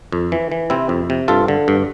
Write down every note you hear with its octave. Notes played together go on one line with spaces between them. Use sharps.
F2
E3
E3
C3 C4 E4
F2
C3
G2 F4 A4
D3
G2